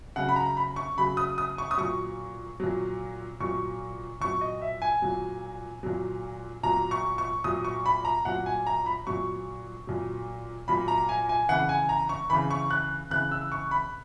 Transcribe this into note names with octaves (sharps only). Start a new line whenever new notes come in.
C#3 F#3 F#5
B5
A#5
B5
C#6
C#3 F#3 B5
D#6
D#6
C#6
D#6
A#2 F#3 C#6
A#2 F#3
A#2 F#3 C#6
A#2 F#3 C#6
D#5
E5
G#5
A#2 F#3
A#2 F#3
A#2 F#3 A#5
C#6
C#6
A#2 F#3 D#6
C#6
B5
A#5
A#2 F#3 F#5
G#5
A#5
B5
A#2 F#3 C#6
A#2 F#3
A#2 F#3 B5
A#5
G#5
G#5
C#3 E3 F#5
G#5
A#5
C#6
C#3 E3 B5
C#6
F#6
C#3 E3 F#6
E6
C#6
B5